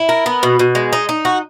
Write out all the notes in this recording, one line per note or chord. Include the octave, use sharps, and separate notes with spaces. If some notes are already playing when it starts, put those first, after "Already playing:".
Already playing: E4
A#4
B3
B2
B2
G#3
D#4
D#4
F#4